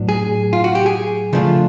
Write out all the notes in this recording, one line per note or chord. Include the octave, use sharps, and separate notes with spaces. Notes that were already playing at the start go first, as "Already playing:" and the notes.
Already playing: A2 F#3 B3 D4
G#4
F4
F#4
G4
G#4
C#3 F3 A3 D4 F4